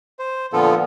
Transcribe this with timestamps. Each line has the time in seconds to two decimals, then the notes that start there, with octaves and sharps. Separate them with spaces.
0.19 C5
0.53 A#2 D3 F3 B3 F4 A4